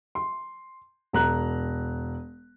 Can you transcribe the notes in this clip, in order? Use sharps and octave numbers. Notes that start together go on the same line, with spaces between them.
C6
E1 A#5 F#6